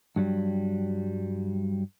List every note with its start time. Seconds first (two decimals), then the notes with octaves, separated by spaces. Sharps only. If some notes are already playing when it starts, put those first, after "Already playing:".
0.16 G2 F#3 G3